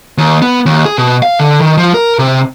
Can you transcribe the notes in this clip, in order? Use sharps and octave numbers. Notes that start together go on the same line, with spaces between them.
D#2
B3
D#2
G#4
B2
F5
D3
D#3
F3
A#4
C3